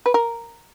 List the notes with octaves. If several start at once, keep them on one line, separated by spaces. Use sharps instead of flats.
B4
A#4